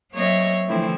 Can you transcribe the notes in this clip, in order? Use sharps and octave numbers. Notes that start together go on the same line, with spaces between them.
F#3 A#3 C4 C#5 D#5 E5
D3 E3 F3 A3 C4 E4